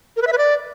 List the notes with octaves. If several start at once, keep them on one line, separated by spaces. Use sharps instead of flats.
A#4
B4
E5
B4
D5